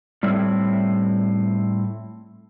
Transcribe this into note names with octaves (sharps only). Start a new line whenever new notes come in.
A2 G3 C4 E4 A4 C#5